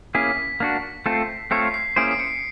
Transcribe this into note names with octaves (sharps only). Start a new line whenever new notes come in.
A#3 C#4 E4 G#4 B6
A#3 D4 F#4
A3 C4 F4 A4 C7
A3 C4 F4 A4 C#5 C7
C7
A#3 C#4 E4 G#4 C5 D7
C7
C#7